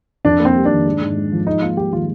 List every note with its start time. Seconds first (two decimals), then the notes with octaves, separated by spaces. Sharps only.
0.25 F2 D4
0.40 A#3
0.45 C4
0.55 G3
0.65 D#3 D4
0.85 G#2
1.01 G#2
1.16 G#3
1.32 F3
1.46 G#2 D#4
1.62 A#3 F4
1.77 G3 G4
1.93 D#3 F4